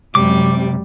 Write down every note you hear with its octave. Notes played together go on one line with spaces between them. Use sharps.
F#2 C3 G3 G#3 D6